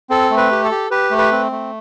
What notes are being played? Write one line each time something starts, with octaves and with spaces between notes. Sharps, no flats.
C4 A4
A3
B4
G4
A4
G4
G4 B4
A3
B4
C4
A3